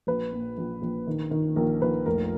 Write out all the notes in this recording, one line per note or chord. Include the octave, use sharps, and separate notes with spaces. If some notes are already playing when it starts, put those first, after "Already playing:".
A#1 B4
A#2
A#1
A#1
D#3
D#3
A#1 A#4
A#1 B4
F1 A#4